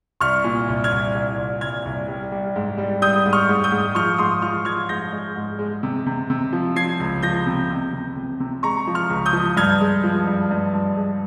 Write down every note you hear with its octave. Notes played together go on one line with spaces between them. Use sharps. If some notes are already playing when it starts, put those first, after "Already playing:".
C2 C#6 F6
A#2
C2
F6 G#6
C2
C2
C2
C2 F6 G#6
C2
G3
G3
G#2
G3
G3 D#6 G6
G#2
C#6 F6
G#2
D#6 G6
G#2
F3 C#6 F6
G#2 C6 D#6
F3 C#6 F6
F3 F6 G#6
G#2 G6 A#6
G#3
G#2
G#3
C3
C3
C3
F3
F3 G#6 C7
C#2
F3 G6 A#6
C3
C3
C3
C3
C3
G#3 A#5 C#6
F3
C#6 F6
C#2
D#6 G6
F3
G2 F6 G#6
G#3
F3
G2
G2
G2
G#3